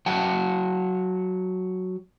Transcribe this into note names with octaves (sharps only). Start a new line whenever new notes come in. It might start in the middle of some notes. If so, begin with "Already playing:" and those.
F#3 F#5 G5 A5